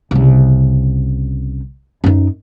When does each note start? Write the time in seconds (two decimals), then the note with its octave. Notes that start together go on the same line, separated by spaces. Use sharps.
0.11 C2 C#3
2.04 F#2 D#4